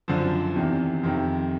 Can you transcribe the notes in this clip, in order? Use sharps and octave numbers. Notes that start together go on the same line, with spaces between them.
F#2 D3 F3
E2 C3 D#3
F2 C3 D#3